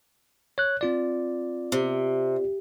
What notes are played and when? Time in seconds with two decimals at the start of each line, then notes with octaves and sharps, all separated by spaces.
0.58 C#5 F#6
0.81 C4 F4 D5
1.72 C3